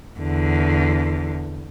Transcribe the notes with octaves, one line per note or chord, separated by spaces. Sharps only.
E2 D3